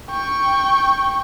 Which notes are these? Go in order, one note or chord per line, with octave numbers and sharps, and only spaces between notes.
G5 C#6